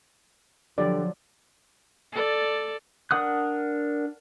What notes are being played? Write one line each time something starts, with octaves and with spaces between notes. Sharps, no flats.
D3 F3 F#3 G4 D5
A4 D5
D4 A#4 F#5 D#6 F#6